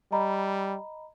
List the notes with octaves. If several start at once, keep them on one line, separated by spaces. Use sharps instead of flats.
G3 D#5 A#5 B5